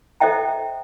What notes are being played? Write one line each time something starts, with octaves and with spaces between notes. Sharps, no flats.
A4 C5 D#5 E5 G5 A#5